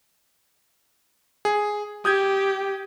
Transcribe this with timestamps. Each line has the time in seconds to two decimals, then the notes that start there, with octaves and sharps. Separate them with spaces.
1.45 G#4
2.05 G4 D#6 G6 G#6